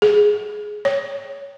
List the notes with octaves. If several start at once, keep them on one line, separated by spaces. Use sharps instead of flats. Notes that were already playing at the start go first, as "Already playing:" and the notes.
G#4
C#5